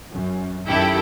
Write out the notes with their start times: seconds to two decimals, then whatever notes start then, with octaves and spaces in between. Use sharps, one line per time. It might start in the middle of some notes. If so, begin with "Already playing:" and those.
0.11 F#2
0.66 F#2 D#3 E4 G4 A4 G5